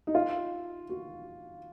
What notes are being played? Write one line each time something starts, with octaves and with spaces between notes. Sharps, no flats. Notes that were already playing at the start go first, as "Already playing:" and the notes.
D#4
F4
F#4